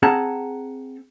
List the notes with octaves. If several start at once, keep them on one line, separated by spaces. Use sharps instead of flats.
C4 G#4 F#5 A5 A#5